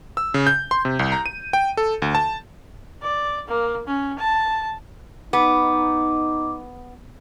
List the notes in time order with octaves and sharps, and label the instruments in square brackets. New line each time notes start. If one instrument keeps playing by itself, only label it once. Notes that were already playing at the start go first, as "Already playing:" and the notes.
[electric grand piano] E6
C#3
G6
C6
C3
C2
A#5
D#7
G5
A4
D2
A5
[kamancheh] D5
A#3
C#4
A5
[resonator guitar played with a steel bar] B3 [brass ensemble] D#4 [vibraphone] D6